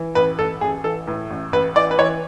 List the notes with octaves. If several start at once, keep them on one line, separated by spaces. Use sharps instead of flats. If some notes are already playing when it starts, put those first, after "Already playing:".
Already playing: E3
A1 B4
A1 A4
A1 G#4
E3 A4
A2 B4
A1
A1 B4
E3 D5
B4
E3 C#5